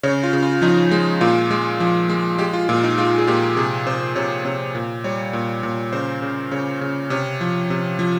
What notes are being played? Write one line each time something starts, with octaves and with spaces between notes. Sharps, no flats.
C#3 C#5
F4
C#3
F4
F3 D#4
G#3
A#2 F4
G#3
F3
G#3
G#3 G4
F4
A#2 F4
D#4
G#3 F4
G#4
A#2 G4
C3 G#4
C3 C5
C3 C#5
C3 C#5
A#2
G3 C#5
A#2
A#2
C#3 C5
C#3
C#3 C#5
C#3
C3 C#5
F3
C3
F3